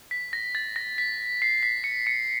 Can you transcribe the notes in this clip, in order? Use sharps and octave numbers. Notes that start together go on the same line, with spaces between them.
B6
A#6
A6
A#6
B6
C7
B6
C#7
C#7